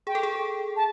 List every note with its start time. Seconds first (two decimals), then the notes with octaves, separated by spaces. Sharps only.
0.07 G#4 G5
0.15 A4
0.23 G#4
0.76 A5